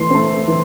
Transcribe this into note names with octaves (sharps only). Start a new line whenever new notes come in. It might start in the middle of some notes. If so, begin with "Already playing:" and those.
Already playing: E3 A3 C6
A3 C4
E3